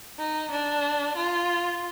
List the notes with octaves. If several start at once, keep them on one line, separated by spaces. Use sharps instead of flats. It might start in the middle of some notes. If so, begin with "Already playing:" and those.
D#4
D4
F4